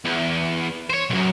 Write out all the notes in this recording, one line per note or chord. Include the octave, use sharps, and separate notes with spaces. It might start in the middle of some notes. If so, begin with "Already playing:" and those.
E2
C5 C#5
B1 F#2